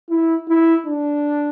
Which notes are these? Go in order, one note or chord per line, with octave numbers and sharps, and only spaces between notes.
E4
E4
D4